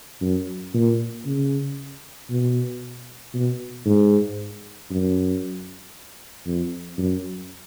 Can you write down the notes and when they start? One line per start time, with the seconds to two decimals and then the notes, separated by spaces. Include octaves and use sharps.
0.21 F#2
0.74 A#2
1.26 C#3
2.30 B2
3.33 B2
3.86 G#2
4.90 F#2
6.46 F2
6.98 F#2